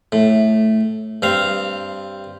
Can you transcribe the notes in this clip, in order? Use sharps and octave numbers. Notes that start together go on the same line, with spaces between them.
A2
G2 C4 F5